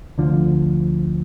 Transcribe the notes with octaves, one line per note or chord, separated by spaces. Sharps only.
D2 D3 F3